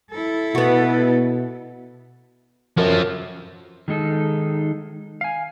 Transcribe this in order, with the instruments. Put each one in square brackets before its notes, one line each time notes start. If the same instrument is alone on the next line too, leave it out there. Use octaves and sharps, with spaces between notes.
[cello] E4 A4
[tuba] B2 [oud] B3 F#4
[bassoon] F#2 [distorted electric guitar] F3 A4
[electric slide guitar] D#3 G#3 D#4 A4
F5 G#5